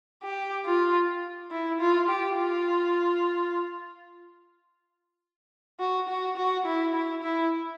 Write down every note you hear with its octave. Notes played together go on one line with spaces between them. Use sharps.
G4
F4
E4
F4
G4
F4
F#4
F#4
F#4
E4
E4
E4